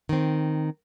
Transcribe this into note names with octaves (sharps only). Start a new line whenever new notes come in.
D#3 C4